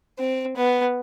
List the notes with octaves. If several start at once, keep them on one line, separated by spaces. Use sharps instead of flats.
C4
B3